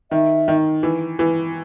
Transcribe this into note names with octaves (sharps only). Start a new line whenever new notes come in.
D#3 E5
D#3
E3
E3